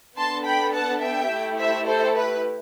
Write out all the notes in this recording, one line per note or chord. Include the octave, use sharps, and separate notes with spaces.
B3 D4 A4 A5 C6
G5 B5
F#5 A5
E5 G5
A3 E4 G4
C5 E5
A4 C5
B4